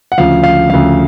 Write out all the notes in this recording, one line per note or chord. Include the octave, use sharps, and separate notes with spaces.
F#5
D2 C#3 F3 F5
F5
D2 C#3 F3 F5